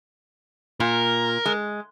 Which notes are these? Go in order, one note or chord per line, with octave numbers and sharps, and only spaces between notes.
A#2 A#4
G#3